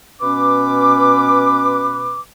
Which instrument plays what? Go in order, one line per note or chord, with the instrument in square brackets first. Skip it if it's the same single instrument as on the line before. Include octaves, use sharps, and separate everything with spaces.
[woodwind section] B2 C#4 B4 D6